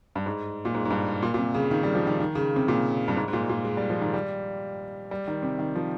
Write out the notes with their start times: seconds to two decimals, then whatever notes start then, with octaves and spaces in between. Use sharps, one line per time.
0.15 G2
0.26 G#2
0.65 A#2
0.74 G#2
0.85 G#2
0.90 G2
1.23 A#2
1.34 A#2
1.38 C3
1.55 C#3
1.71 D#3
1.83 G3
1.95 F3
2.07 D#3
2.20 D#3
2.35 C#3
2.56 C3
2.68 A#2
3.08 G2
3.17 G#2
3.28 G#2
3.33 A#2
3.49 A#2
3.65 G#3
3.77 G3
3.90 F3
4.02 D#3
4.14 G3
5.11 G3
5.28 D#3
5.43 C3
5.59 D#3
5.75 F3